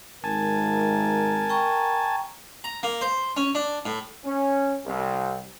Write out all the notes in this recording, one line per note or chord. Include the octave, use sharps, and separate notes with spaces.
G#1 A#4 G#5 A5
G5 A#5 C#6
A#5
A#3
C5
C#4
D4
A2
C#4
C2